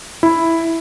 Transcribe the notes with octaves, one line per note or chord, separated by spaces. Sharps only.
E4